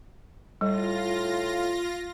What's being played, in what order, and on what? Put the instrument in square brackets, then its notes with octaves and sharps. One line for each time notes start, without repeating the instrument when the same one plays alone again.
[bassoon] A2 [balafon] G3 [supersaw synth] F4 A#6